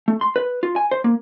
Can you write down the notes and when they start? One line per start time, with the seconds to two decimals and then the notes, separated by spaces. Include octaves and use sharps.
0.08 A3
0.21 C6
0.36 B4
0.63 F4
0.76 G#5
0.91 C5
1.04 A#3